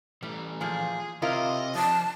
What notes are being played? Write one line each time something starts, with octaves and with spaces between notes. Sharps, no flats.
E3 G3 A3
A#2 F3 G#4
C3 E4 F4 A#4 D#5
F3 A5